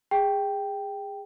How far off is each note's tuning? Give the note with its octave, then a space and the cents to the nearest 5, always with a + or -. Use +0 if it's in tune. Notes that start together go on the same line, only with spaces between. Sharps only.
G#4 -25 G5 +0